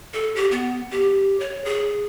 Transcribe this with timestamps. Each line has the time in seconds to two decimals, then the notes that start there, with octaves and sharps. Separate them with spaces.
0.14 A4
0.36 G4
0.51 B3
0.91 G4
1.40 C#5
1.65 G#4